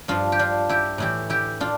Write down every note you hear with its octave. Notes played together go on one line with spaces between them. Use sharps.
G2 F3 D4 F4
G4
D4 F4
E4 G4
A2 E3 E4 G4
E4 G4
D4 F4